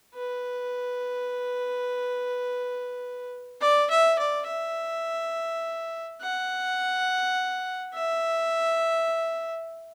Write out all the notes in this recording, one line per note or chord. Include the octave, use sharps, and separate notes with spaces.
B4
D5
E5
D5
E5
F#5
E5